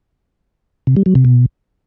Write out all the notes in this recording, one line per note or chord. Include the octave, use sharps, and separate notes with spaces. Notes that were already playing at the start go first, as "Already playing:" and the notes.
C3
G3
F#3
C3
B2